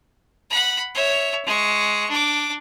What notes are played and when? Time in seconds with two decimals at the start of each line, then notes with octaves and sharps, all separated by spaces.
0.50 F#5 B5
0.94 C#5 E5
1.45 G#3 C#6
2.09 D4 D6